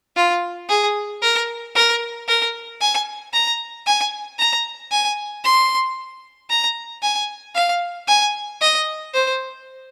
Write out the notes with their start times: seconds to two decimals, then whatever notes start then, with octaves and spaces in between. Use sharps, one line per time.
0.16 F4
0.69 G#4
1.22 A#4
1.75 A#4
2.28 A#4
2.81 G#5
3.33 A#5
3.86 G#5
4.39 A#5
4.91 G#5
5.44 C6
6.50 A#5
7.02 G#5
7.55 F5
8.08 G#5
8.61 D#5
9.14 C5